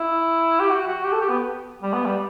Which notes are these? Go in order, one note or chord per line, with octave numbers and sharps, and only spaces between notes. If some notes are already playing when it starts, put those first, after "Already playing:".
Already playing: E4
G4
F#4
F#4
G4
A4
G4
B3
G3
B3
G3